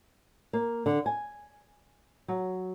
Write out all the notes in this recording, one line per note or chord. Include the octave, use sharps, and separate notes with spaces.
A#3
D3
G#5
F#3